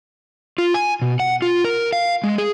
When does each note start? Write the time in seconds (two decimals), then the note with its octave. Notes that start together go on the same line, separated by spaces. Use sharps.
0.58 F4
0.74 G#5
1.02 B2
1.20 F#5
1.42 F4
1.65 A#4
1.93 F5
2.24 G#3
2.38 G#4